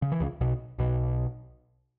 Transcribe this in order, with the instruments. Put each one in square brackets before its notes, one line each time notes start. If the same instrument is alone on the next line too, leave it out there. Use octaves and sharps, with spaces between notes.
[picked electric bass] C#3
E3
C#2 C#3
B1 B2
B1 B2